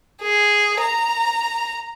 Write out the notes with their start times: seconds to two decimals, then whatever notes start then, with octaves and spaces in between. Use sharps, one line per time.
0.22 G#4
0.80 A#5